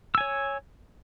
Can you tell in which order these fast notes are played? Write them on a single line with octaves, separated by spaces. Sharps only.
E6 G#5 C#5